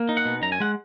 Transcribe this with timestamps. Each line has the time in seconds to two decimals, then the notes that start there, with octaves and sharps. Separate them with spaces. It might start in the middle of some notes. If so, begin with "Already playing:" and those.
Already playing: A#3
0.09 D#4
0.17 F#5
0.25 B2
0.42 F#2 A#5
0.52 G#5
0.60 G#3 F#5